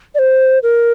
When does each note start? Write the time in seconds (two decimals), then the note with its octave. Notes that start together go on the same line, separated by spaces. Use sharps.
0.15 D5
0.19 C5
0.63 A#4